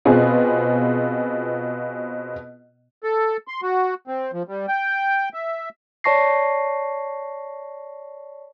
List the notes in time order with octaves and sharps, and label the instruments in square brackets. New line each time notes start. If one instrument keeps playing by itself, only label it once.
[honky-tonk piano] B2 B3 C4 F4 G#4
[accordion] A4
C6
F#4
C4
F3
G3
G5
E5
[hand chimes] C#5 D5 A5 C#6 A#6 C7